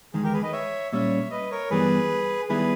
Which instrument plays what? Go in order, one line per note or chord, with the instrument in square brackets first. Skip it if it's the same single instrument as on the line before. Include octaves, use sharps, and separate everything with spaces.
[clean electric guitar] E2 D#3 G#3 [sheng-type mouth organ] G#4
[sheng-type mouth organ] G4 A#4
G#4 B4
B4 D#5
C#5 E5
[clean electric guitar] A#2 G3 C#4 [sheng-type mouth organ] C#5 E5
[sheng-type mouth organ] B4 D#5
A#4 C#5
[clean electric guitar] G2 E3 G3 B3 [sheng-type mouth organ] G#4 B4
[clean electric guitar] D#3 G3 B3 E4 [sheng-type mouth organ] G#4 B4